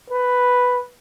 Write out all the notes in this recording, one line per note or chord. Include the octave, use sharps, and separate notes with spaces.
B4